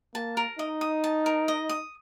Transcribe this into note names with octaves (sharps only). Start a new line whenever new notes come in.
A#3 A5
A#4
D#4 D#5
D#6
A5
A#4
D#5
D#6